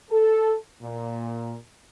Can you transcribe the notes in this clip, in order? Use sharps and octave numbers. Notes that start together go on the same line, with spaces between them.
A4
A#2